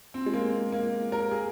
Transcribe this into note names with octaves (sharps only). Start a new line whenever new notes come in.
C4
G#3
A#3
A#3
A#4
G#4